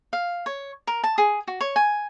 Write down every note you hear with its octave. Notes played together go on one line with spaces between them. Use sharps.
F5
C#5
A#4
A5
G#4
F#4
C#5
G#5